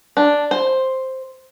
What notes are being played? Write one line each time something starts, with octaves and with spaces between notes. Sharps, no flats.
D4
C5